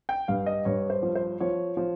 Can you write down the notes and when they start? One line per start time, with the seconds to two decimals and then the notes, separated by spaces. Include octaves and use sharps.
0.09 G5
0.28 G2 F5
0.46 D#5
0.65 G2 C#5
0.90 C5
1.03 F3
1.15 C5
1.40 F3 C#5
1.77 F3